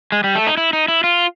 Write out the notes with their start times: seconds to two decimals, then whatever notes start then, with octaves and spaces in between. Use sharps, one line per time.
0.12 G#3
0.24 G3
0.35 A3
0.47 D#4
0.57 E4
0.73 D#4
0.88 E4
1.04 F4